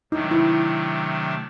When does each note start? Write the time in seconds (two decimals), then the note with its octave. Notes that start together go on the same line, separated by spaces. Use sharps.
0.12 C3 D#3 F#3 A3 D4 D#4
0.31 E4